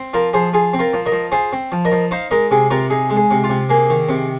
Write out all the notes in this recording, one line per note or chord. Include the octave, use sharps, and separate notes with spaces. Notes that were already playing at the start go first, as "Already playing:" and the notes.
Already playing: C4
F3 F4 A#4
F3 G#4 C5
F4 G#4
C4
F4 A#4
F3
A#4 D#5
F3
F4 G#4 C5
C4
F3
A#4 D#5
F3
D#4 C5 F5
G#3 A#4 D#5
C3 G#4
C3 F4 A#4
D#4 G#4
G#3
G#4
C3
F4
C3
A#3 G#4
D#3
C3